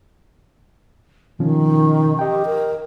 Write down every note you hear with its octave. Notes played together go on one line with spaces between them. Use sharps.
B2 D#3 F3 C#4
G4 D#5 G5
A#4